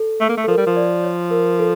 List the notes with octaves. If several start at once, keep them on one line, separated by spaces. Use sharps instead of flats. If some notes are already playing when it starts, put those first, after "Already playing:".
Already playing: A4
A3
A#3
A3
A4
F3 A#4
G3
F3
D5
C#5
A#4
A4